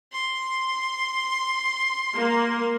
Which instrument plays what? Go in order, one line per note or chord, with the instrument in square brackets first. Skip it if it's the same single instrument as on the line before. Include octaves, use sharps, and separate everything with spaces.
[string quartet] C6
[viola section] A#3